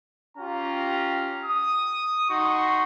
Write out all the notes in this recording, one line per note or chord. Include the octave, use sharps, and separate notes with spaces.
C#4 F4 G4 A#5
D#6
D#4 F#4 C6 C#6